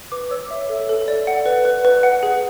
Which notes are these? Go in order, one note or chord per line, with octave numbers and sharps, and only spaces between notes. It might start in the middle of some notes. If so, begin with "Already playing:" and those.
B4 D6
C#5 E6
E5
A4
A4
D5
F#5
B4
B4
B4
F#5
G#4